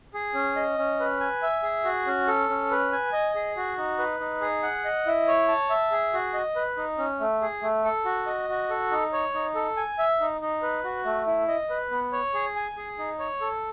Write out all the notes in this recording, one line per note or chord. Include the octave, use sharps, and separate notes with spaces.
G#4
C#4
D#5
C#4
B4
G#5
E5
G#4
F#4
C#4
A4
C#4
B4
G#5
D#5
G#4
F#4
D#4
B4
D#4
G#4
F#5
D#5
E4
C#5
A5
E5
G#4
F#4
D#5
B4
D#4
C#4
A3
G#4
A3
A4
F#4
D#5
F#4
A4
D#4
C#5
D#4
A4
G#5
E5
D#4
D#4
B4
F#4
A3
E4
D#5
B4
B3
C#5
G#4
G#5
G#4
D#4
C#5
A4